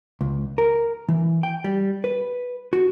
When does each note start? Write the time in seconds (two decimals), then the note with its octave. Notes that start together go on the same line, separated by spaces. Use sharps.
0.21 C#2
0.58 A#4
1.09 E3
1.43 G5
1.64 G3
2.04 B4
2.73 F#4